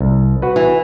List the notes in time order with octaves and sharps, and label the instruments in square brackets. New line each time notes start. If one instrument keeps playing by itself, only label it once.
[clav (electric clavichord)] C2
F#4 B4
[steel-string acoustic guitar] E3